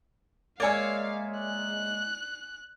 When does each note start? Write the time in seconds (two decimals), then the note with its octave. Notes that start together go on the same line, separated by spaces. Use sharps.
0.60 G#3 A#3 C#5 D5 E5 F5 G#5
1.39 F#6